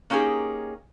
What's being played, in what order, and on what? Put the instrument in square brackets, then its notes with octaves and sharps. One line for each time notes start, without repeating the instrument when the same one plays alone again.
[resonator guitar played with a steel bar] A#3 C#4 D#4 G4 G#4